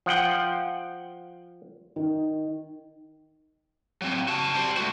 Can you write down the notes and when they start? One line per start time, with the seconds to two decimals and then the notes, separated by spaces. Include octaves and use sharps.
0.06 F3 F#5 G5
1.96 D#3
4.02 F#3 C4
4.28 F#4 A5
4.54 G3 C5
4.77 A3 F#4